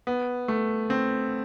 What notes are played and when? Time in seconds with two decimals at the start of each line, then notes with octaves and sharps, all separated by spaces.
0.07 B3
0.48 A3
0.90 C4